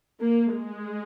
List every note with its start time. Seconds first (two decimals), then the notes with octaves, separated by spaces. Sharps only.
0.20 A#3
0.54 G#3